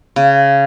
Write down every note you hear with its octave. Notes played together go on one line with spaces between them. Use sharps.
C#3